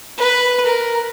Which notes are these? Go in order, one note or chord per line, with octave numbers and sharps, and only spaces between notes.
B4
A#4